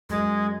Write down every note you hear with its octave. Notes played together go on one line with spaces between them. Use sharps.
F#2 G#3